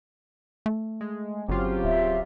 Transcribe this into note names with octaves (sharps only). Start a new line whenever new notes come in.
A3
G#3
G1 C#3 F#3 C4 F4 G4
D1 E5